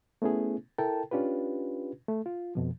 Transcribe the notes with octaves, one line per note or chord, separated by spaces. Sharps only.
A3 B3 C#4 E4 G#4
E4 A4 A#4 G5 A5
C#4 D4 F4 G4 B4
A3
F4
F2 B2 F3